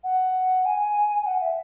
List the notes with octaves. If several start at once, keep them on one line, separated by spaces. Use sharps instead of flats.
F#5
G#5
G#5
F#5
E5